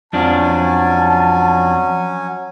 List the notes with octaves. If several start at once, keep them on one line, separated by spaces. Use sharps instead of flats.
F2 F3 F#3 C#4 D4 G#5 A5